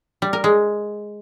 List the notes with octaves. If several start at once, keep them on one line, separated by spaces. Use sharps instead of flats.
G3
A#4
G#3